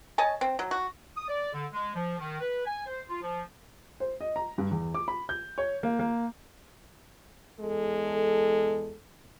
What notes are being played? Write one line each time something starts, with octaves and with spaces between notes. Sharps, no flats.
C#5 D#5 G#5 A5
C4
F#3
F#4
D#6
D5
D3
G#3
F3
D#3
B4
G#5
C5
F4
F3
C5
D#5
A#5
G2
E2
D6
B5
G6
C#5
A#3
A#3
E2 G#3 A4